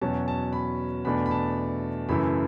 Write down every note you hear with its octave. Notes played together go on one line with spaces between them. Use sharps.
E2 B2 F#3 C#4 A5
A5
B5
E2 B2 A3 D4 B5
B5
A5
F#2 C#3 E3 A3 E4 B5